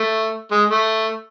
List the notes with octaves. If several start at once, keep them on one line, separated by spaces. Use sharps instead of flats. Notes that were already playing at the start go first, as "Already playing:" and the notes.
Already playing: A3
G#3
A3